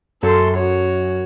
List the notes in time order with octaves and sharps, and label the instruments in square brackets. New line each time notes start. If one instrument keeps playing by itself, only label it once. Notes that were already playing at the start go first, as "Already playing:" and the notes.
[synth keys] F#2 [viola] A4 C6
[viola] F#4 C#5